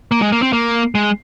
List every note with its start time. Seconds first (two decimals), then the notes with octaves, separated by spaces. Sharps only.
0.12 A#3
0.22 G#3
0.32 A#3
0.42 C4
0.53 A#3
0.95 G#3